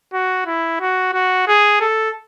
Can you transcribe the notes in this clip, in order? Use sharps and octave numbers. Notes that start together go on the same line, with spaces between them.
F#4
E4
F#4
F#4
G#4
A4